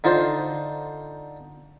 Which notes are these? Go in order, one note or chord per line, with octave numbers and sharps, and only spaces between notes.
D3 D#4 F4 C5